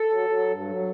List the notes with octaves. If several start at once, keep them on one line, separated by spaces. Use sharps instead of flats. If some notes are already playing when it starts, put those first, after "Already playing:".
Already playing: A4
F#3
F#3
G2
F#3